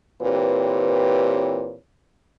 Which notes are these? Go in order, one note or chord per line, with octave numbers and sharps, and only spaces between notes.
A#2 E3 C4 G4 B4 C#5